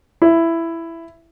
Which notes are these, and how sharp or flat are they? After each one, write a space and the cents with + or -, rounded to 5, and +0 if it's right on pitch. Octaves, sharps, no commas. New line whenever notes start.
E4 +10